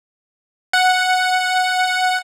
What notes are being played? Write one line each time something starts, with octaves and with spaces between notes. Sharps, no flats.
F#5